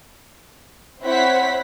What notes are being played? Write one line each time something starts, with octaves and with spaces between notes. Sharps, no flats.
C4 E4 C5 C#5 F#5 B6